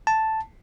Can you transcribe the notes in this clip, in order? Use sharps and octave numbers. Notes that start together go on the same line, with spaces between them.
A5